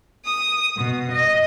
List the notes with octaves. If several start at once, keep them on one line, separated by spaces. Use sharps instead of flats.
D#6
B2
D#5